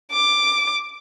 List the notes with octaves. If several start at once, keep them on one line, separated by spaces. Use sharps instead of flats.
D6